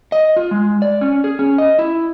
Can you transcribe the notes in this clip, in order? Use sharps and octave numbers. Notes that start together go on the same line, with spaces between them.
D#5
F4
G#3
D5
C#4
G#4
C#4
D#5
E4